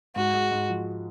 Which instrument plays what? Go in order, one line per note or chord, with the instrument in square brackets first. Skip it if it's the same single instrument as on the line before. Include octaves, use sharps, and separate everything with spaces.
[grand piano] G#2 [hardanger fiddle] F#4
[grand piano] G#3
G#2
F3